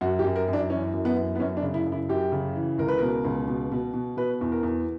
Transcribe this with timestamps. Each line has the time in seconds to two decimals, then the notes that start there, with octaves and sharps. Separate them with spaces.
0.01 F#2 F#4
0.19 G4
0.24 F#2
0.36 A#4
0.48 F#2
0.53 D4
0.70 E3 C#4
0.93 F#2
1.05 B3
1.16 F#2
1.35 B3
1.39 F#2 C#4
1.57 D4
1.63 C#3
1.74 E4
1.87 F#2
1.92 E4
2.09 F#2 G4
2.32 C#3
2.56 E3
2.78 C#2 A#4
2.88 B4
2.98 B2 A#4
3.25 C#2
3.48 B2
3.71 B2
3.94 B2
4.17 B2 B4
4.41 E2
4.52 A#4
4.63 E2